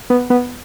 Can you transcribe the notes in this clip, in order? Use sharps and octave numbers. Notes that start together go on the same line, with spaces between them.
B3
B3